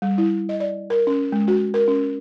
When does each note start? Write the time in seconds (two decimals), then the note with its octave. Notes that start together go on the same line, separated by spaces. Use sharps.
0.02 G3
0.18 E4
0.49 D#5
0.60 D5
0.90 A#4
1.07 C#4
1.32 G#3
1.48 F#4
1.74 A#4
1.88 C#4